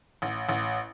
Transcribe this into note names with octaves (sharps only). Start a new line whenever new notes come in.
A1
A1